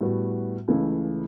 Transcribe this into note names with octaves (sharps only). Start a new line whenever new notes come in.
A2 G3 B3 F#4
C#2 C#3 E3 A3